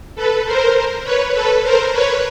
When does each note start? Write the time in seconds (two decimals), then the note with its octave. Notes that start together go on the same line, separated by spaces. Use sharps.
0.15 A4 B4
0.45 A#4 C5
1.04 B4 C#5
1.33 A4 B4
1.63 A#4 C5
1.93 B4 C#5